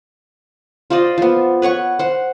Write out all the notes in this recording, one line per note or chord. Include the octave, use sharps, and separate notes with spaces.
F4 C5 D5 D#5
F3 B3
B4 C#5 F#5 C#6
C5 F#5